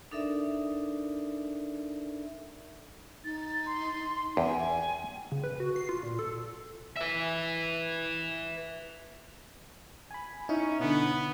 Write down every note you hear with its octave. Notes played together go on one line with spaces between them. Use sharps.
D4 D#4 A4 A#4 D5 E5
D#4 A6
C6
E2 G5 G#5
C#3
B4
F#4
C7
F4
A#2
A4
B4 E5
G#5 B5
C#4 D#4 E4
B2 D3 B3